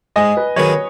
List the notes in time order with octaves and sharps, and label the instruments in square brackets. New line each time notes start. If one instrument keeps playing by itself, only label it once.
[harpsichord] G#2 [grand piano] D#5 G#5
[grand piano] B4
[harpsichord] D#3 F#3 B3 G#4 [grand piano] C#5